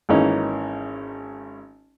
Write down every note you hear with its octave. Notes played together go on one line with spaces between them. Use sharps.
G#1 E3 A#3 C#4 D#4